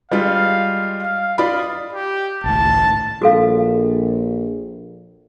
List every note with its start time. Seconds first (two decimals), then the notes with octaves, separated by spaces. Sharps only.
0.12 G3 G#3 F4 F5
1.02 F5
1.38 F4 D5 D#5 B5
1.93 G4
2.44 G#1 C#2 A2 A5
3.22 A#1 F#4 A4 F5